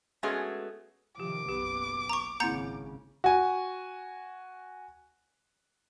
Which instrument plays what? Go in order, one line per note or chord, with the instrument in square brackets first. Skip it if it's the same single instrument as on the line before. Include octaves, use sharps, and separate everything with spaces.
[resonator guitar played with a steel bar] G#3 A3 B3 C#4 F#4 G#4
[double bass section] C3 D#3 F3 [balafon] G4 [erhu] D6
[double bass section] F#1 B1 B3 [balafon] G4
[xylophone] A#5 C#6
[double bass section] G#1 C#3 [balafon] A#3 C4 E4 [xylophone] A#5 G6 C#7
[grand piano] F#4 G#5